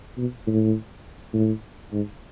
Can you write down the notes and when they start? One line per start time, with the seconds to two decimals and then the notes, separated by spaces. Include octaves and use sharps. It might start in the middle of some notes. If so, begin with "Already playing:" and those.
0.18 B2
0.47 A2
1.34 A2
1.92 G#2